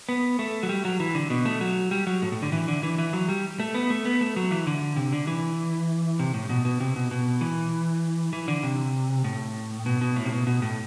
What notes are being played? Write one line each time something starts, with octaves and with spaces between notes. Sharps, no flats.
B3
A3
F#3
G3
F#3
E3
D3
B2
A3
F#3
G3
F#3
A2
A2
D3
E3
D3
E3
E3
F#3
G3
A3
B3
A3
B3
A3
F#3
E3
D3
C3
D3
E3
C3
A2
B2
B2
C3
B2
B2
E3
E3
D3
C3
A2
B2
B2
A2
C3
B2
B2
A2